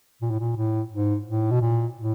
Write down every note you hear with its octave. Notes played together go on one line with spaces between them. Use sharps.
A#2
A2
A#2
A2
G#2
A2
B2
A#2
A2